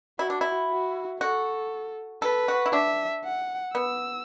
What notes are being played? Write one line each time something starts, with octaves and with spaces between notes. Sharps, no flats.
E4 F#4
D4
E4
F#4
F#4 A4
A4 B4
F#4
E4
D4 E5
F#5
B3 E6